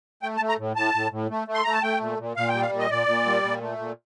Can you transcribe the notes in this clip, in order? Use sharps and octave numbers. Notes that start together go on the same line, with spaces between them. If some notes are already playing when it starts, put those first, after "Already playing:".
A3 G5
A5
A3
A#5
A2
A2 A5
A2
A2
A3
A3
C6
A3 A#5
A5
A3 G5
A#2
A#2
A#2 F5
G5
G3
F5
A#2
D#5
A#2 D5
A#2
G3
A#2
A3
A#2